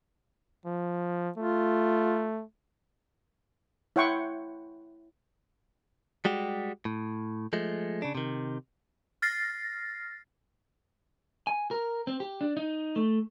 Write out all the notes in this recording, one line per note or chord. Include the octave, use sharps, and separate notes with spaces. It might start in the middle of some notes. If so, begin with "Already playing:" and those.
F3
A3 F4
E4 C#5 F#5 G5 C6 C#6
G3 G#3 F#4 G4
A2
F3 G#3 A3
C#3 D4
C3 D#3
F6 A6 A#6 C7
G#5
A#4
C4
G4
D4
D#4
A3